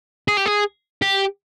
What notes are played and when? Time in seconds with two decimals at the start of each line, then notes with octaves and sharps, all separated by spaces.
0.28 G#4
0.37 G4
0.46 G#4
1.02 G4